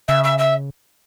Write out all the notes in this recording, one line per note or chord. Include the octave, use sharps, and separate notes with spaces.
C#3 E5
E5
E5